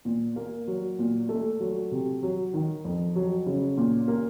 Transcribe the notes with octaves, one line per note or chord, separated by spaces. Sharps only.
A#2
A#3
F#3
A#2
A3
F#3
C3
F#3
D#3
F2
F#3
C#3
A#2
A#3